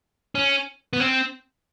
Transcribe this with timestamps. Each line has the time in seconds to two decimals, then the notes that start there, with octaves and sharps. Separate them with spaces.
0.35 C#4
0.93 B3
1.00 C4